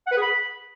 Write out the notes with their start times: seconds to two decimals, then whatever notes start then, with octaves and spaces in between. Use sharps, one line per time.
0.07 F#5
0.12 B4
0.17 G#4
0.22 B5